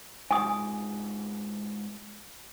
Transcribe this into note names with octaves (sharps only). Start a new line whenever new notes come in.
G#2 B2 G#5 D#6